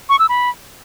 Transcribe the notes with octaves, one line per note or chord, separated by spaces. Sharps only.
C#6
E6
B5